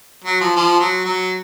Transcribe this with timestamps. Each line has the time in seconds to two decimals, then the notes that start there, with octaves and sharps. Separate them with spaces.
0.24 F#3
0.40 F3
0.56 F3
0.80 F#3
1.05 F#3